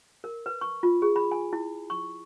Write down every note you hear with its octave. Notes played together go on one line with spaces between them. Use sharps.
A#4
B4
C#6
F4
G#4
B5
G#5
E4
C#6